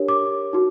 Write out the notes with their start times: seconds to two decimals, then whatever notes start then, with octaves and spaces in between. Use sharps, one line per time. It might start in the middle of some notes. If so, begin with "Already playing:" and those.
Already playing: D4 G4 A#4 C#5
0.08 D6
0.53 D#4 F#4